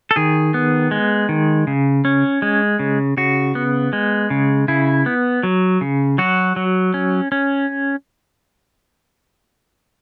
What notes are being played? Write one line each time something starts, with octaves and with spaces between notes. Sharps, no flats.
A4
D#3 G#4
B3
G#3
D#3
C#3
C#4
G#3
C#3
C#3 F#4
B3
G#3
C#3
C#3 E4
B3
F#3
C#3
F#3 F#4
F#3
C#4
C#4